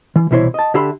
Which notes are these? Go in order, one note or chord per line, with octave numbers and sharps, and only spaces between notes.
E3
C2 B2 E3 E4 C5 C#5
D#5 A5
D3 G4 E5 B5 C6